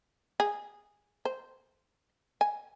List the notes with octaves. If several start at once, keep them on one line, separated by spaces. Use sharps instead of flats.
G#4
C5
G#5